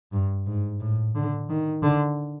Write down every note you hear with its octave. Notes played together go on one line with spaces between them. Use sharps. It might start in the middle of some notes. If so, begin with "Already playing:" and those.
G2
G#2
A2
D3
D#3
D3